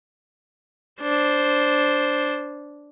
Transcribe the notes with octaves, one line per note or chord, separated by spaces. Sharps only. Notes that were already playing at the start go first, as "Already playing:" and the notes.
D4 C5